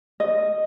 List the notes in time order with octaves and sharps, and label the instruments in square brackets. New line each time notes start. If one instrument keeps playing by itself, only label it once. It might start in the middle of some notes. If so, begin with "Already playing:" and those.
[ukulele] D#5